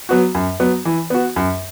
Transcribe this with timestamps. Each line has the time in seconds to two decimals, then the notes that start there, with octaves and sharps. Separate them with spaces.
0.09 F#3 B3 F#4
0.35 F#2
0.60 F#3 B3
0.85 E3
1.10 B3 F#4
1.36 F#2